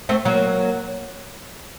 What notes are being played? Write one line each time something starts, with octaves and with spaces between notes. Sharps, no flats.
A3 C4
F#3 A#3